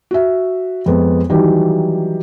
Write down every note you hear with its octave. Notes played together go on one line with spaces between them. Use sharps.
F#4 E5
F2 G#3 B3
D#3 E3 F#3 G3 G4